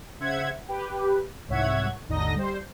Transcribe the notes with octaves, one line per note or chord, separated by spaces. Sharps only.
C#3 C5 E5 F#5 G#6
G4 B4
C2 G#2 C#5 E5 F#5 G#6
G#1 D#2 D3 D#4 D#5 A#6
G3 C5